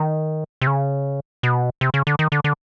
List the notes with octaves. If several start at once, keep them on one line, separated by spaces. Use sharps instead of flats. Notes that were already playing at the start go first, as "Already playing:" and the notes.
Already playing: D#3
C3
C#3
B2
C3
C#3
D3
D#3
D3
D3